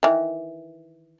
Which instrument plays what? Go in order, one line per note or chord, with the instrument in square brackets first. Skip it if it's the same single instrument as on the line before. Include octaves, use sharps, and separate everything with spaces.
[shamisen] D#3 E3